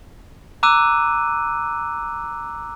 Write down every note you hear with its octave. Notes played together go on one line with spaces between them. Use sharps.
A#5 D6 E6 F#6 D#7